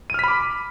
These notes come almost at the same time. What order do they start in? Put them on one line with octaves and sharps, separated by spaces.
D#7 F6 B6 B5 D6